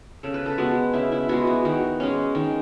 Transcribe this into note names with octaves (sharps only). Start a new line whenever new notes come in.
C#3 A4
B4
A4
G#3 B3 F#4
C#3 E4
E4
G#3 B3 F#4
F#4
D#3 F#4
G#3 C#4
D#3